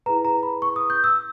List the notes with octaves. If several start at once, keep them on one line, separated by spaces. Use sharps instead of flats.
E4 G#4 B4 A#5
A#5
B5
C#6
D#6
G6
E6